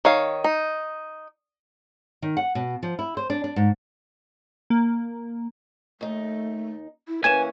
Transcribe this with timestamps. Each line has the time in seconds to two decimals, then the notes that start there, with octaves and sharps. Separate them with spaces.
0.05 D#3 C#5 F5
0.44 D#4
2.22 D#3
2.37 F#5
2.55 B2
2.83 F3
2.99 E4
3.17 C5
3.30 D4
3.44 D4
3.56 G#2
4.70 A#3
6.01 D#2 A3 D#4
7.08 E4
7.24 E3 A#3 C#4 B4 G#5 G#6 E7